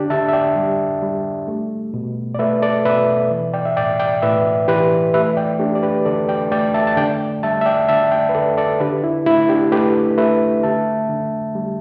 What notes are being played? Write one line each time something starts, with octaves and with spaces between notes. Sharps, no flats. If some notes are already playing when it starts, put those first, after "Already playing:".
Already playing: D3 D4 G4
D3 E5 A5
E5
D5 G5
G3
G3
A3
B2
D5
A3 B4 E5
A4 D5
B2 B4 E5
E3
D5 G5
E5
A2 D5 G5
D5 G5
A2 B4 E5
E3 G4 B4
A3 B4 E5
D5 G5
A3 D4 G4
D5
G4 B4
D3 A4 D5
D5 G5
A3 D5 G5
E5 A5
A5
D3 D5 G5
G3 E5 A5
E5
D5 G5
D3 E5 A5
D5 G5
B4
D3 A4 D5
A4 D5
D3 G4 B4
E4
A3 E4
D4 G4
A3 G4 B4
A3 B4 E5
D3 E5 A5
D3
G3